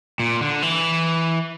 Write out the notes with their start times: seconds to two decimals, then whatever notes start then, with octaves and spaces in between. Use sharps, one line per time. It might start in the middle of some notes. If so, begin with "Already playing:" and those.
0.20 A#2
0.41 D3
0.62 E3